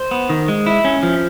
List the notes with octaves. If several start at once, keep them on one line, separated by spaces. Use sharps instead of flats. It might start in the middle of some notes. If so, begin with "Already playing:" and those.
Already playing: C5
B3
D#3
G#3
E4
C#4
F3